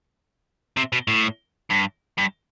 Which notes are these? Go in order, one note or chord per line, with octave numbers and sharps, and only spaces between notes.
C3
B2
A2
G2
G2